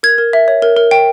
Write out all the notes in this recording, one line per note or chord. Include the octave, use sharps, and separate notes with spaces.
A#4 G#6
A#4
E5
C#5
A#4
A#4
G5